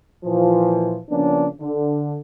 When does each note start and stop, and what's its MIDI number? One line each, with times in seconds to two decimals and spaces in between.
0.25 0.98 46
0.25 0.98 52
0.25 0.98 53
1.11 1.47 49
1.11 1.47 53
1.11 1.47 58
1.11 1.47 59
1.11 1.47 61
1.11 1.47 62
1.60 2.17 50